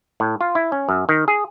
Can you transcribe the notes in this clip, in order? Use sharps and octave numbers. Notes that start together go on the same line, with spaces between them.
A2
F4
E4
C#4
F#2
D#3
G#4